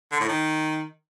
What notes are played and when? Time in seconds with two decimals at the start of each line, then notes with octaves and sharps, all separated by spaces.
0.12 D3
0.20 A2
0.29 D#3